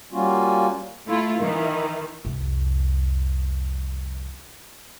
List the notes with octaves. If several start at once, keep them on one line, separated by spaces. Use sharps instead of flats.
G3 A#3 C#4 F4 F#4
A3 E4 F4
D#3 E3
C2 F2